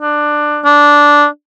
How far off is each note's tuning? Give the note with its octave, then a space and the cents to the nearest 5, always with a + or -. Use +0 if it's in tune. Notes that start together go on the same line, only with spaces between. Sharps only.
D4 +15
D4 -10